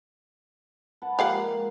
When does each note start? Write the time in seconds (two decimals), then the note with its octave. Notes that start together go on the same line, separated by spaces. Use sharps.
1.02 B4 F#5 A5
1.19 F3 G#3 A#3 G4 F5 F#5